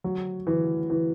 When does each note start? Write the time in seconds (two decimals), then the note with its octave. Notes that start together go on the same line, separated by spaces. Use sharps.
0.04 F#3
0.47 E3
0.90 E3